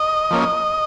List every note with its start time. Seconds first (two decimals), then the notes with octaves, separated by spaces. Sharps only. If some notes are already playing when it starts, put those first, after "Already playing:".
Already playing: D#5
0.31 F3 A#3 C#4